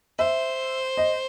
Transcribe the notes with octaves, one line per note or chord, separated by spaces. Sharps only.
C5 E5
D#5